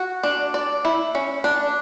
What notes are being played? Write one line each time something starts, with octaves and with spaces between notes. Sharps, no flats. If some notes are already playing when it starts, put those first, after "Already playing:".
Already playing: F#4
D4
D5
E4
C#4
D4